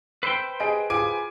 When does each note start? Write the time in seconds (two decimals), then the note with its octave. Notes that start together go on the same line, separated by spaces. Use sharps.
0.23 B4 C5 G5 C6 E6 C7
0.60 G#4 D#5 D7
0.90 F4 G#4 G#5 D6 D7